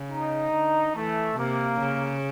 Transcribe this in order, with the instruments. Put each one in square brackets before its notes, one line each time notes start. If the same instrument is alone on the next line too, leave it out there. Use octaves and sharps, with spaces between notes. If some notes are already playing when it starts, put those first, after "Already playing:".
Already playing: [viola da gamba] C#3
[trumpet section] D#4
[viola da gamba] D3
[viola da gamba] E3 [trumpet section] A3
[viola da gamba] C3 [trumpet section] A#3
[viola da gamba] C#3